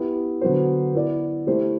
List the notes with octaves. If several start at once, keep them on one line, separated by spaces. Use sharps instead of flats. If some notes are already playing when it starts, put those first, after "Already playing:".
Already playing: B3 E4 G4
D3 F#3 B3 F#4 C5
B3 E4 B4 D5
A3 E4 G4 C5